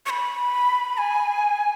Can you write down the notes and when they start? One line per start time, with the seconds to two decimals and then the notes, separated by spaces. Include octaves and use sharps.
0.06 C#6
0.10 B5
0.98 G#5